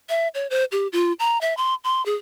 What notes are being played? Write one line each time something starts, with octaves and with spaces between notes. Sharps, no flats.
E5
C#5
C5
G4
F4
A#5
E5
C6
C6
G#4